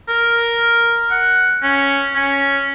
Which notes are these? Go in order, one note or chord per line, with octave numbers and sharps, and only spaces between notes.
A#4
F#5
C#4
C#4